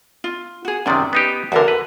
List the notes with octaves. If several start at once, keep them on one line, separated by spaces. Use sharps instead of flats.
F4
F#4 G#4
F#2 C3 D#3 C#4 D5
B3 D#4 G4
E2 D3 F#4 A4 A#4
B4